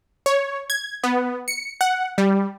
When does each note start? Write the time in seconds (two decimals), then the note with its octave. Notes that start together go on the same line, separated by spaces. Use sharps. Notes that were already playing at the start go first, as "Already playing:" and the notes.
0.26 C#5
0.70 G#6
1.03 B3
1.48 C#7
1.81 F#5
2.18 G3